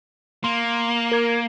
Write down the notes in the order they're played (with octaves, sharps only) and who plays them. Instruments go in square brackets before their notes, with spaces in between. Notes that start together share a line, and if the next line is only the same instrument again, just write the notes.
[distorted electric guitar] A#3 [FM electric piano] C6
[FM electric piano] A#4 G#6